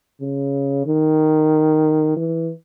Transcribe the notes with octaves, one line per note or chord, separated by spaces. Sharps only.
C#3
D#3
E3